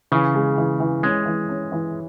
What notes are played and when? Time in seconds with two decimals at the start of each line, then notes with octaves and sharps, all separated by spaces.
0.12 C#3 E3
0.35 G#3
0.58 E3
0.80 E3
1.03 G#3 C#4
1.26 E3
1.49 C#4
1.72 E3